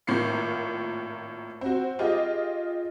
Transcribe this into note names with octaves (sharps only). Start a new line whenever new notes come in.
G#1 A2 A#3 F4 C7 C#7
C4 F#4
F4 G4 G#4 D#5